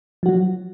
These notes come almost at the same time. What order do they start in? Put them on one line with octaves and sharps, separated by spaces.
F3 F#4 F#3